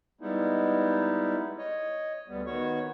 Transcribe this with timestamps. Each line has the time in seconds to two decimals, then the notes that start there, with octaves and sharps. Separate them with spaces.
0.21 G3 G#3 B3 D#4 E4
1.59 C#5 D#5
2.28 D2 G3 B3
2.47 D#3 B3 F#4 C#5 C#6